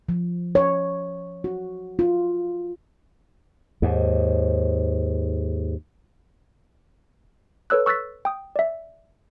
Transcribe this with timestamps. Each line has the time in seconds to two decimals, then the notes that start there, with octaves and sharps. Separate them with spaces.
0.09 F3
0.55 C#5
1.44 F#4
1.99 F4
3.82 D#2 G#2
7.70 A4 B4 C#5 E6 F#6
7.86 C#6 E6 F#6 A6 B6
8.25 G5 D#6
8.56 D5 E5